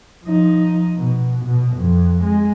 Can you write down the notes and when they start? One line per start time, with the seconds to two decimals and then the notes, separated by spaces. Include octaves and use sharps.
0.25 F3 D#4
0.98 B2
1.44 B2
1.76 F2
2.23 G#3